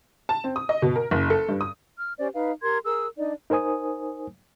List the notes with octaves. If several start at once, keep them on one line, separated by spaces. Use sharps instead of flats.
A5
C4
D#6
D#5
B2
A#4
F#1
A4
G2
D#6
F6
C#4 G4 C5 D5
D#4 B4 F5
G4 A#4 C6 G#6
G#4 A#4 E6
D4 D#4 D5
D#4 A#4 C5 G#5 D#6